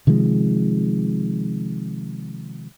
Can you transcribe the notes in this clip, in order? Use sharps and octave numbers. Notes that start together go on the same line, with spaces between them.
C3 D#3 F3 G#3